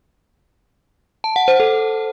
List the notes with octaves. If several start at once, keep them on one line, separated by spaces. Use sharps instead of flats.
A5
F#5
C5
A4